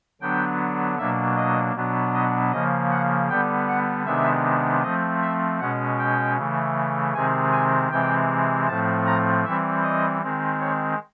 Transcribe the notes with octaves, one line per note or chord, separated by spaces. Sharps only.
D3 F#3 B3 D4 G5
B2 F#3 A#3 D4 E5
D#5
B2 F#3 B3 D4
D#5
C#3 F3 A#3 D#5
F#5
D3 G3 B3 G5
F#5
C3 D#3 G#3 B3 D4 E5
F3 A3 C4 D#5
E5
B2 G#3 C#4 F#5
G5
C#3 E3 A3
C3 D#3 G#3 C4 G#5
G#5
C3 E3 G#3 C4 G5
A2 F3 A3 C4 A5
A#5
E3 G3 C4 E5
D#5
D#3 G#3 C4
C#5